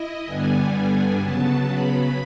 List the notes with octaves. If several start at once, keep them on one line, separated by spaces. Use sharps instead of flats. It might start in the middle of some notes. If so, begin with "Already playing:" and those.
Already playing: E4 D#5
G2 D3 G3 B3 D4 G#5
G#5
C#3 F#3 B3 A5
B5